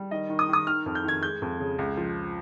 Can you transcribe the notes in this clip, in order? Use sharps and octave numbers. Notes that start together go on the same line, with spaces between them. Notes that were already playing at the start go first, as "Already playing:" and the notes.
Already playing: G3
D#3 D#5
D#3
D#6
D#3 D#6
D#3 F6
F2
G6
D#3 G#6
G#3 G6
F2
C#3
C#2
F3